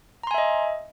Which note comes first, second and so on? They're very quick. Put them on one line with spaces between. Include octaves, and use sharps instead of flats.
A#5 C6 G#5 E5 D#5